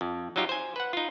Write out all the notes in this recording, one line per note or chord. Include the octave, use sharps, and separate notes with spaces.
F2
F#3 G3 D#4 F4 G4
C5 G#5
B4 F#5
D#4 F4